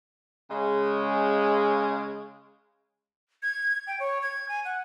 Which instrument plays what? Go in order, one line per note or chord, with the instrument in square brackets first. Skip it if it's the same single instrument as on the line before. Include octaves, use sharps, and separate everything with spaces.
[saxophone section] C#3 G#3
[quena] G#6
G5
C#5
G#6
G#5
F#5